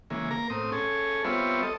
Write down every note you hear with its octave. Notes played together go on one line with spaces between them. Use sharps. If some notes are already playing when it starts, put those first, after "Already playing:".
C#3 E3 G#3 A#3
A#3 A#4 A#5
A2 C4 D#6
C#4 G#4 A4
G3 B3 C4 F4 C#5 E5
A4 D#5